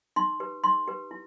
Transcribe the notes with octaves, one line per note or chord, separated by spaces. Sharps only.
D#4 C6
G4 B4
D#4 C6
G4 B4
E4